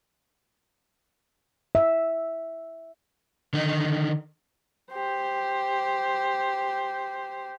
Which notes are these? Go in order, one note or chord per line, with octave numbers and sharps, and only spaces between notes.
E5
D3 D#3 D#4
G4 C5